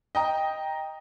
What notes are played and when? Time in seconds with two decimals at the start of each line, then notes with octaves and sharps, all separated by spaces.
0.15 D#5 G5 A#5